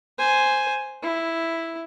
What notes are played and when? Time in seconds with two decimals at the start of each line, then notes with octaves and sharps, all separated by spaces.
0.18 C5 G#5
1.03 E4